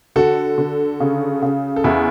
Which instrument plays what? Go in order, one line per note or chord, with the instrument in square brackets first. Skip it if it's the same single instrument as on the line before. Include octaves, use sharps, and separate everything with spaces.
[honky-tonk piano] D3 [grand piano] F#4 A4
[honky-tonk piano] D3
C#3
C#3
[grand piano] A4
[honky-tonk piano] E2 [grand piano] E4 G#4